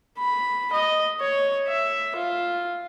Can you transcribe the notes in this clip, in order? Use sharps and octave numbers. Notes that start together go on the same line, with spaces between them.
B5
D#5
C#5
E5
F4